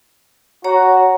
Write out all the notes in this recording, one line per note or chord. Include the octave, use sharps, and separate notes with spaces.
F#4 C#5 A#5